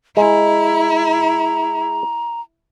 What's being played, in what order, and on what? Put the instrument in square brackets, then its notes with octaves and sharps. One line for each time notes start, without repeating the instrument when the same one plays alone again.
[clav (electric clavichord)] G#3 [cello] E4 [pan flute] A#5